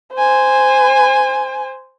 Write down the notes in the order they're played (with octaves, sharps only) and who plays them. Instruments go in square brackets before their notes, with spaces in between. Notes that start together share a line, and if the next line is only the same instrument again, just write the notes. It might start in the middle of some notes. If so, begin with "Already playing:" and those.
[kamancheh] C5 G#5